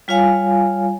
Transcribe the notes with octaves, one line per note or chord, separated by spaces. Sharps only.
G3 F4 C#5 F5 G#5